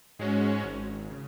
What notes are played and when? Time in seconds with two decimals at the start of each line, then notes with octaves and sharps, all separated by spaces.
0.19 G#2 G#3 C#4 F#4
0.64 G#1
1.10 C#3